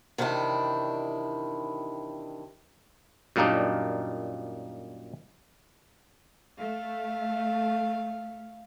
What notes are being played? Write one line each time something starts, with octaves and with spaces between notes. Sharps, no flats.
C3 D#3 E3 D4 E4
F#2 A#2 G3 A#3 D4 D#4
A3 F5